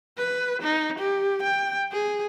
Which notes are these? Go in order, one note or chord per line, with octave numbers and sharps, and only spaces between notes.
B4
D#4
G4
G5
G#4